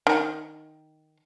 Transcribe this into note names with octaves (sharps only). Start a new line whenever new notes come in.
D#3